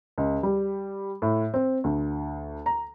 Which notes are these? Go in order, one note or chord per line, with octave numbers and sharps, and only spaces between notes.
C#2
G3
A2
C4
D2
A#5